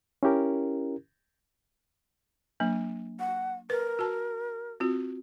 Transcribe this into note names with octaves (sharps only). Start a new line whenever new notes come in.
C#4 E4 G4 A#4
F#3 A#3 D4
F#5
A#4 B4
F#4 A5
C4 F4 F#4